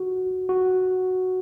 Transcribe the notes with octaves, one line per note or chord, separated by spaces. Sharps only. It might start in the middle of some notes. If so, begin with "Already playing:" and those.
Already playing: F#4
F#4